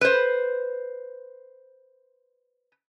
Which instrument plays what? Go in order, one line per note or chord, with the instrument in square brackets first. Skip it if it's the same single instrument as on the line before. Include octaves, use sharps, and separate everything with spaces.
[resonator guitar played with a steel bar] B4 C5